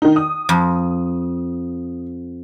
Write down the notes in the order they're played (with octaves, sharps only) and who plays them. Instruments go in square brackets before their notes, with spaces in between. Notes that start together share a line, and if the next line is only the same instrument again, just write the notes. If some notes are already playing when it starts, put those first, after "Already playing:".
[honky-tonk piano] D#3 D#4
D#6
[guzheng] F2